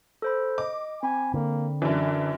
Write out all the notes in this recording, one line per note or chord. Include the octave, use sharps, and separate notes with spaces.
A4 C5 B5
D#5 D6
C4 G#5 B5
D3 A#3
F#2 E3 D4